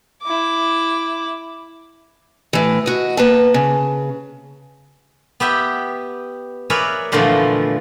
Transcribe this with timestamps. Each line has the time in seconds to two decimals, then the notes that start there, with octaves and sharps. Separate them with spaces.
0.22 E4 D6
2.53 A2 E3
2.86 F#4 D#5
3.17 A#3 B4 A5
3.54 C#3
5.40 B3 G4 E5 G5
6.70 G#4 A#4 B4 C#5 D5 E5
7.12 E2 A#2 D3 E3 F3 A3